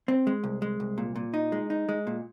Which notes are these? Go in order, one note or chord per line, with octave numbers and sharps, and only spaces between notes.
C4
G#3
C2
G#3
C2
A#2
A#2
D#4
G#3
D#4
G#3
A#2